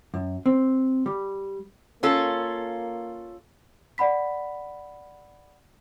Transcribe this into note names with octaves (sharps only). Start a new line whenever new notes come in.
F#2
C4
G3
A#3 C#4 F4 A4
D5 F#5 B5 B6